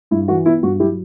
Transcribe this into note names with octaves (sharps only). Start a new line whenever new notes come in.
G2 E4
E3 F#4
B3 E4
G2 F#4
F#3 E4 G4